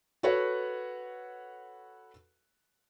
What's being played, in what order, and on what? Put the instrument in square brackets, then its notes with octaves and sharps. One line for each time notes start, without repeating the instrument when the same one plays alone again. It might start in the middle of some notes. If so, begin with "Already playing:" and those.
[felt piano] F#4 A4 B4 C#5 F#5